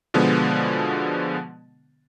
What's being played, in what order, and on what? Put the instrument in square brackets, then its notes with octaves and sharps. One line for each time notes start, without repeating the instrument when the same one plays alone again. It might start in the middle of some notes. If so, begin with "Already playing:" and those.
[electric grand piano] B2 D3 F3 G#3 B3